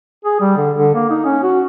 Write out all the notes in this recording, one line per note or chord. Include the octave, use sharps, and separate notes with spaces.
G#4
G3
D3
D3
A#3
D#4
C#4
F#4